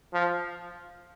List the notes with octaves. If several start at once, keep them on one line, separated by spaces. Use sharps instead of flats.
F3